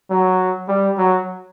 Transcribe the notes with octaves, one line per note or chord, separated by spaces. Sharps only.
F#3
G3
F#3